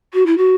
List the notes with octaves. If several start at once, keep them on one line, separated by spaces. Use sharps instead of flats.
F#4
E4
F#4